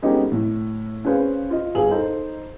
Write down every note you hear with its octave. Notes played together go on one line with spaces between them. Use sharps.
G#3 B3 C#4 D#4 G4 A4
A2
C#4 G#4 B4 C5 F5
F4 D#5
G1 G#4 F5 F#7
D#4 A4 C5